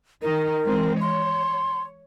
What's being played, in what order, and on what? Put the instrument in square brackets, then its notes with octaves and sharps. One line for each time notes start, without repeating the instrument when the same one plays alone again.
[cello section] D#3 D#4 [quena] A#4
[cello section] E3 G#3 C4
[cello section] C#5 [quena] C6